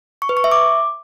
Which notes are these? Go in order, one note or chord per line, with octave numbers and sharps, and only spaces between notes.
C#6
B4
C#6
E5
D6